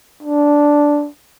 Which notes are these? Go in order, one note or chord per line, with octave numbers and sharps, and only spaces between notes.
D4